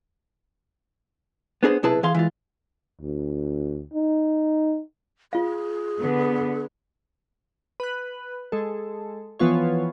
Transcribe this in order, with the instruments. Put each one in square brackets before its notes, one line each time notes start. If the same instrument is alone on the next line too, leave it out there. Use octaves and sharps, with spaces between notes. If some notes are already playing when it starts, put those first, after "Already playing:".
[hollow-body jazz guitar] B3 D4 G#4 A#4 C5
B1 C3 E4 G#4 B4 A5
E3 G#4 F5 C6
E3 G#3 F4
[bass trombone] D2
D#4
[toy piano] F4 F5 [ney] G#4
[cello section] D3 B3
[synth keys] B4 F#6
G#3 A4
E3 F3 B3 F4 C#5